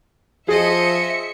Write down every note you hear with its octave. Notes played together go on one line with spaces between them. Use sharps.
F3 G#4 C5 D#5 E5 C#7